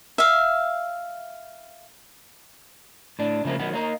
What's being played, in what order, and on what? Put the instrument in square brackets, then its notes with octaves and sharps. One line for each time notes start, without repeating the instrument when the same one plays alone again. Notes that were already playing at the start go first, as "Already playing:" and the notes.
[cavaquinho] E5 F5
[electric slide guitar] A2 D4
C#3 F3 A3 A#3
D#3 F#3 B3
A#3 D#4